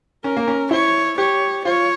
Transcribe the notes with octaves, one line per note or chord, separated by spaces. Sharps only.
C#4 A#4
A#3
C#4
E4 C#5
G4 C#5
F4 C#5